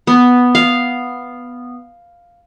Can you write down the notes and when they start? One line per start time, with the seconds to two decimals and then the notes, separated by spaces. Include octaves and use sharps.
0.07 B3
0.55 F5